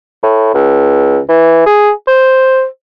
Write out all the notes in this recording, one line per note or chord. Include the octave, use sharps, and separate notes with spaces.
A2
C#2
E3
G#4
C5